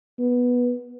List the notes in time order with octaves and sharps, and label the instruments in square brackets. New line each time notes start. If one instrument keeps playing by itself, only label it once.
[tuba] B3